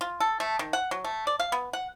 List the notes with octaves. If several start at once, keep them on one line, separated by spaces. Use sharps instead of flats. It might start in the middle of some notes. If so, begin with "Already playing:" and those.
F4
A4
A3
D#3
F#5
F#3
A3
D5
F5
B3
F#5